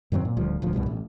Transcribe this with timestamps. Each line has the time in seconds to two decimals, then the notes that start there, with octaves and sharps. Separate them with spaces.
0.12 F#2 D#3 F#3 C4
0.25 A#2
0.37 D1 D2 F3 G3
0.62 D#1 D2 F3
0.73 C2 G#2 B2 G3
0.86 A1